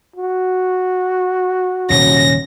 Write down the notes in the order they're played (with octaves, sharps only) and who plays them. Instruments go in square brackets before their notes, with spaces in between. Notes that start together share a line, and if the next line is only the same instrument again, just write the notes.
[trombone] F#4
[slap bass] D#1 C3 [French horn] C#4 [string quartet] A#6